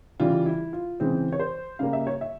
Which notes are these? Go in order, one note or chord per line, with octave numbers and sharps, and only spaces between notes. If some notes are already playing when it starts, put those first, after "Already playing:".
C#3 E3 G3 F4
E4
F4
C#3 E3 G#3 C4
C#5
C5
C#3 G3 A#3 F5
E5
C#5
E5